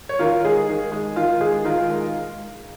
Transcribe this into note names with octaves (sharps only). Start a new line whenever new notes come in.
C#5
D#3 F4 A#4
G#3 G#4
D#3
G#3
D#3 F4
G#3 G#4
D#3 F4 A#4
G#3